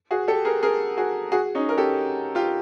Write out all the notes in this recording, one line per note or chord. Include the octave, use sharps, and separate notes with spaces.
F#4 G#4
G4 A4
G#4 A#4
G#4 A#4
F#4 G#4
F#4 G#4
C#4 D#4
A#4
G4 A4
F4 G4